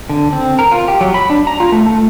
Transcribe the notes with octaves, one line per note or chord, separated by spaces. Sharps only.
D3
C4
A#4
F4
G4
F#3
B5
D4
A#5
F4
A3
A3